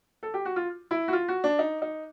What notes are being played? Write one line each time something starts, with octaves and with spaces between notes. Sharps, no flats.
A4
G4
F#4
F4
E4
F#4
F4
F#4
D4
D#4
D#4